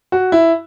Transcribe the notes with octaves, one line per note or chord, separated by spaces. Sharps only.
F#4
E4